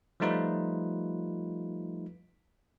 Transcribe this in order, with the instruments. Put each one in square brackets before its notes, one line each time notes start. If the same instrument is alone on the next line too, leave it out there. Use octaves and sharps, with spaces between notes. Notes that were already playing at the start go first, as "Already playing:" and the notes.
[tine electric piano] F3 G3 A3 D#4 F4 B4